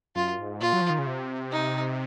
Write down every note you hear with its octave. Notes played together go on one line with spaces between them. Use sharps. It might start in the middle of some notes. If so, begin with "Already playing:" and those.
F#2 F4
G#2
A#2 F4
F#3
F3
D#3
C#3
C3
D#4